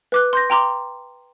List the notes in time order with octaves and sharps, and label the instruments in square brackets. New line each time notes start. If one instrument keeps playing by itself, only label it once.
[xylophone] B4 D6 F#6
C6 G6 A#6
G5 A#5 C6 D6